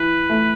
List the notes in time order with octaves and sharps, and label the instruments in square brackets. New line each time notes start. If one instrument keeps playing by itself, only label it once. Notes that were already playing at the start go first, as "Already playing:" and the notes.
Already playing: [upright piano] E3 [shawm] B4
[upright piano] A3